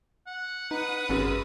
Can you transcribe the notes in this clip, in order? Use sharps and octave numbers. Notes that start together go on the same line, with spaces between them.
F#5
D#4 B4 D#6
G#1 F#2 G#3 F#4